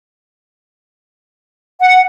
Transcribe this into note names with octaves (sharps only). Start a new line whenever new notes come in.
F#5